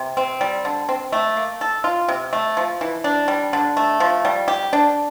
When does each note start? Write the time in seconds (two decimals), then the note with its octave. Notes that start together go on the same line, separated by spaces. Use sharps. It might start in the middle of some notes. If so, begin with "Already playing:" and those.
Already playing: C3
0.17 C4
0.41 G3
0.65 D3
0.89 C4
1.12 A3
1.37 A#3
1.61 A4
1.84 F4
2.08 C3
2.33 A3
2.57 F3
2.81 E3
3.04 D4
3.28 G3
3.53 D3
3.77 A3
4.00 F3
4.25 G3
4.48 G4
4.73 D4